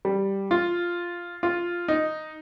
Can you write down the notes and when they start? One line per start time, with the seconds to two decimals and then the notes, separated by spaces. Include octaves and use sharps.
0.05 G3
0.51 F4
1.43 F4
1.88 D#4